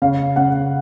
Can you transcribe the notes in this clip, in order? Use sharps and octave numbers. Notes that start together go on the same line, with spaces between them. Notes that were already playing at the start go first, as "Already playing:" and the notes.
C#3 F5
C#3 F#5